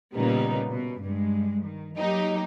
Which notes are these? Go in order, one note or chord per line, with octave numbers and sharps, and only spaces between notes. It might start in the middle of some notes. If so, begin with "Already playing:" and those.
A#2 C#3 G3 A#3 B3 D#4
B2
G2 G#3
D#3
F#3 A#3 D#4 G4